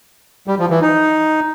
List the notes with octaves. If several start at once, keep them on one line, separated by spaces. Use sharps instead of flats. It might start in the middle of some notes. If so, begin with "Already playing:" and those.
G3
F3
E3
D#4